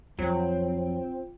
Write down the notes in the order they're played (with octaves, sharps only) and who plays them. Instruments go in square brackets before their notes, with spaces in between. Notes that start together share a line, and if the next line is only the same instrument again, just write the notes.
[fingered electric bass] F2 [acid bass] F#3 [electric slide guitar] C4 [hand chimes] F4 G5